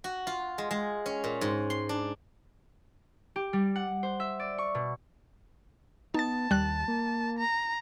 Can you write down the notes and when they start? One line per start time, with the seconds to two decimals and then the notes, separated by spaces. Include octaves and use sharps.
0.04 F#4
0.27 F4
0.58 G#3
0.71 G#3
1.06 C#4
1.24 A#2
1.41 G#2
1.70 C6
1.89 D4
3.36 G4
3.53 G3
3.76 F#5
4.03 C5
4.20 E5
4.39 D5
4.58 C#6
4.75 B2
6.14 B3 D#4 A5 A6
6.51 D#2 G3 F#6
6.88 A#3
7.39 A#5